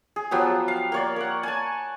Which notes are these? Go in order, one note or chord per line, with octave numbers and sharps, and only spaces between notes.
G#4
F3 F#3 B3 G4
F5
A#3 C#5 D5
A#4 F#5
G#5 A5